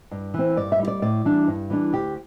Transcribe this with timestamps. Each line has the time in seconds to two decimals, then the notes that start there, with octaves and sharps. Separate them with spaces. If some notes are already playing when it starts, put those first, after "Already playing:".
0.11 G2
0.34 E3 C4
0.56 G2 D5
0.72 E5
0.79 G3 E4
0.88 D5
1.02 A2 D5
1.25 E3 G3 D4
1.47 G2
1.70 E3 G3 D4
1.93 D2 G4